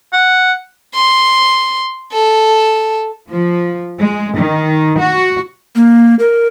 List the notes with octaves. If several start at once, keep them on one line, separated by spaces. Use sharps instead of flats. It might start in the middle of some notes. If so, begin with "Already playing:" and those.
F#5
C6
A4
F3
G#3
D#3
F#4
A#3
A#4